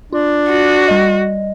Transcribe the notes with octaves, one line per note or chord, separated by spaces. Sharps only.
D4 F4
F#4
G3 D#5